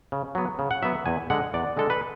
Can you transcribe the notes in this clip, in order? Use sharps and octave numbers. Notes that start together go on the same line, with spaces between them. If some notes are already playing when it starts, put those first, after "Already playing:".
C#3
F#3 B3
C#3
F#5
F#3 B3 E5
E2 G#5
D3 G#3 F#5
E2 D5
D3 G#3 A4
B4